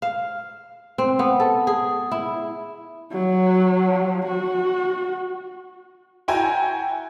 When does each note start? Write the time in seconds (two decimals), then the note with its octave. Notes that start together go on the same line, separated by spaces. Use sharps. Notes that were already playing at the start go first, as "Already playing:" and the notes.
0.02 F5
0.98 C4
1.19 B3
1.40 A4
1.67 G#4
2.11 E4
3.12 F#3
4.26 F#4
6.28 E4 F#4 G5 G#5 A#5